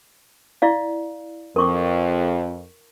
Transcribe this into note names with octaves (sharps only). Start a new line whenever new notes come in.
E4 D5 F5
F2 A#4 C#6 D6